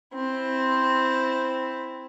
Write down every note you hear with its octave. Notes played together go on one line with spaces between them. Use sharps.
C4 E4